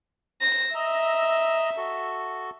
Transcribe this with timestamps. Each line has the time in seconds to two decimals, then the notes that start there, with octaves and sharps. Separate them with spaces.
0.41 C5 A#6
0.75 D#5 E5 A#5 E6
1.77 F#4 A4